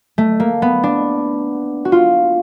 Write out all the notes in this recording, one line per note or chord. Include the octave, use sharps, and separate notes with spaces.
A3
A#3
B3
D4
F#4
F4